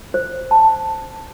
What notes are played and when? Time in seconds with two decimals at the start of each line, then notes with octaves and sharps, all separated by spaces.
0.14 C5
0.51 A5